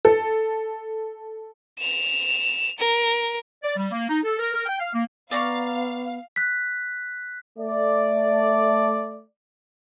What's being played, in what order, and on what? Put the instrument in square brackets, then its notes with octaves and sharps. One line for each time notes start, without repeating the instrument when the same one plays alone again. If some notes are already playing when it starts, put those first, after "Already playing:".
[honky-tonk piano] A4
[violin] E7 F7
A#4
[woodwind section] D5
G3
A#3
D#4
A4
A#4
A#4
G5
F5
A#3
[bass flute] B3 [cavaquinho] D5 A#5 C#6 [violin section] F5
[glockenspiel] F#6 B6
[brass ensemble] A3 D5